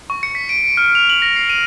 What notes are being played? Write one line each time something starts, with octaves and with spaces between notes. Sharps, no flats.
C#6
C#7
B6
D7
D7
F6
F7
F#7
A#6
C7
D#7